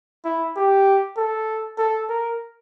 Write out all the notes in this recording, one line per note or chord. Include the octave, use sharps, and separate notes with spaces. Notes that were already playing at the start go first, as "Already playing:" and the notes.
E4
G4
A4
A4
A#4